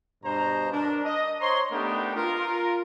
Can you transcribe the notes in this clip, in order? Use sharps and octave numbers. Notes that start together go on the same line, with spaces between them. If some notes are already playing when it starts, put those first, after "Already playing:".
G2 B2 C5 A#5
D4 A#4
D#5
C5 C#5 A#5 C6
A3 B3 D4 D#4 G4 A#4
F4 A#4